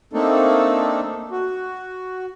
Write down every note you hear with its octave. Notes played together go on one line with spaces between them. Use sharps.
A3 A#3 C4 D4 D#4 A4
F#4